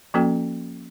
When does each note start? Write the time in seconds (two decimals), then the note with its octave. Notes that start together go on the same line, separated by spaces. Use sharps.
0.14 F3 A#3 C#4 F#4 A4 G5